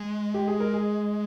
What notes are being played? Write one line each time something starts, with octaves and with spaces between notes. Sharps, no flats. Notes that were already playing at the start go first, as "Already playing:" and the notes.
Already playing: G#3
G4
G#4
A#4
G#4